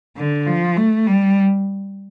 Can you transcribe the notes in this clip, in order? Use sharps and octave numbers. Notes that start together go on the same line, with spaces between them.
D3
F3
A3
G3